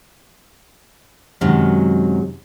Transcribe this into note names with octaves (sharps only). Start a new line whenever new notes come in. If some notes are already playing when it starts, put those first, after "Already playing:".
F#2 C3 D#3 F#3 G#3